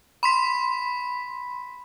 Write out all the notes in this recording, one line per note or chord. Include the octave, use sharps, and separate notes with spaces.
B5 C6 B6